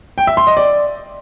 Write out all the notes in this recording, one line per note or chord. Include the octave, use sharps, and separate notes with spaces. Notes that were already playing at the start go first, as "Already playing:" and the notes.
G5
E5
C6
D#5
D5